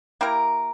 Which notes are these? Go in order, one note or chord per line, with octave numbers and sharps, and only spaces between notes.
A#3 E4 G4 A#4